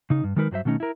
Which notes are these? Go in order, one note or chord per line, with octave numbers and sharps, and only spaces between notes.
C#3 D#4
G2
D#3 F#3 G#3 D#4 A#4 B4
G2 F#3 C5 E5
B2 D#3 A3 C#4 D#4
E4 A#4